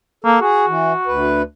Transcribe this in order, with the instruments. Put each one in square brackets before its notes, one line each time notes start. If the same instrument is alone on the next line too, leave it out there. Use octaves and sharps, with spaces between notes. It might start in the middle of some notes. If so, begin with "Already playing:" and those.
[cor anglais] A#3 [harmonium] A4
[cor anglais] F#4 [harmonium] G#4
[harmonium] E3
D2 B4